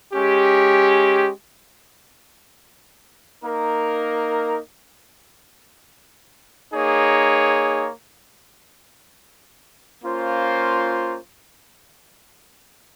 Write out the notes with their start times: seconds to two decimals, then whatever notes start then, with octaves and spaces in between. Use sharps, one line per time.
0.14 G#3 C#4 G4
3.44 A#3 D#4 A#4
6.73 A#3 D#4 G#4 C#5
10.03 A#3 C#4 F4 C5